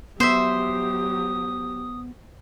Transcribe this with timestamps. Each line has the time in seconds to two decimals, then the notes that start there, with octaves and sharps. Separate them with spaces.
0.20 F#3 B3 G4 C5 E5 D#6